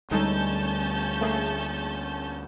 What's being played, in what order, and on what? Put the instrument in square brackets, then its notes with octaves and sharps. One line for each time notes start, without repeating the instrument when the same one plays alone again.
[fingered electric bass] D2 G3 [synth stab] G#3 D#4 A4 [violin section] C#4 A5 G6
[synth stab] A3 A#3 G#4